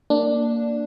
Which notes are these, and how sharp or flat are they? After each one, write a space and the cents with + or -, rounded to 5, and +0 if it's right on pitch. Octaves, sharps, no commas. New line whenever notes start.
A#3 -10 D4 +0